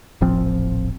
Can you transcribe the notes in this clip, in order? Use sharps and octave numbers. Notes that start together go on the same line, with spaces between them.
D#1 A1 F3 C4